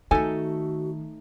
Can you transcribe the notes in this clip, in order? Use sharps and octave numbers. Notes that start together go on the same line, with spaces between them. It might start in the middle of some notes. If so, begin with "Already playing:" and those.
D#3 A3 D#4 F#4 A4 G#5